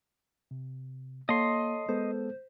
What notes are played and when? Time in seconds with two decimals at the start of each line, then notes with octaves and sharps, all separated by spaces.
0.51 C3
1.29 A#3 A4 C#5 D#5 A5 C6
1.89 G#3 B3 A4 C5